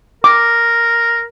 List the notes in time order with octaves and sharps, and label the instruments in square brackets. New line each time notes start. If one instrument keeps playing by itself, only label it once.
[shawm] A#4 [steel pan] D6